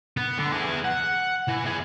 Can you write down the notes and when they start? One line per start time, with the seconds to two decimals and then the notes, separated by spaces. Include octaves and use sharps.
0.17 B3
0.39 D3
0.53 E3 G#4
0.85 F#5
1.48 E3
1.65 E3 G#4